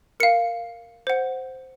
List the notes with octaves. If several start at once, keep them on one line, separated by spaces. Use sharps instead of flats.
A#4 F5 C#7
C5 F#5